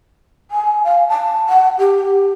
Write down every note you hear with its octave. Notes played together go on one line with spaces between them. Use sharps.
G#5
F5
A5
F#5
G4